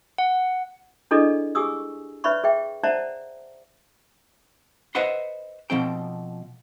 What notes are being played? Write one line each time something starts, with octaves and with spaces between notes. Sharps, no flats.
F#5
D4 E4 G#4 A4 D5 D#5
G4 G#4 G#5 C#6 D#6 E6
B4 C#5 D5 E5 B5 C#6
G#4 E5 G5
C5 D5 E5 F#5 A5 A#5
B4 C5 D#5 E5 F#5 C6
B2 F3 C4 G5